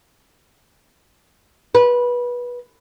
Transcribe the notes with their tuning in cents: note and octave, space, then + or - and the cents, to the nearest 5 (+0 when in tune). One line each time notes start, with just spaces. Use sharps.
B4 -20